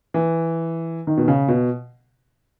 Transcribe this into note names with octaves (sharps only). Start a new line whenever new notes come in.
E3
D#3
B2
C#3
B2